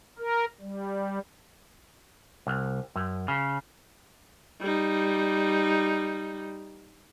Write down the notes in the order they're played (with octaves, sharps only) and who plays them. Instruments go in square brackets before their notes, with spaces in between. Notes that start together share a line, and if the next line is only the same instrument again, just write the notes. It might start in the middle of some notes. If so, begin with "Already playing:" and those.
[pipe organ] A#4
G3
[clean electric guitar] C2
F#2
C#3
[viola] G3 D#4